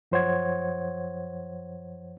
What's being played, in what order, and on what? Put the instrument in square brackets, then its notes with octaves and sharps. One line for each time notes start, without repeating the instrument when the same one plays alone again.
[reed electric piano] F#2 F3 C5 C#5 F#5 G#6